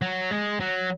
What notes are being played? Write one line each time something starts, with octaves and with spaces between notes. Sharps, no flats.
F#3
G#3
F#3